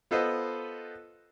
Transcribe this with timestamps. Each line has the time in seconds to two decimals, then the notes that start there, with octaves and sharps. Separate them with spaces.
0.11 B3 F4 A4 B4 C5 D#5